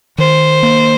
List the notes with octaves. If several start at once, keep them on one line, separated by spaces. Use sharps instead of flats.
D#3 C5
A#3